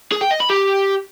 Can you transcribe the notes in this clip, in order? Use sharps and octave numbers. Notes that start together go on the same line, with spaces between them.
G#4
G5
D#5
B5
G4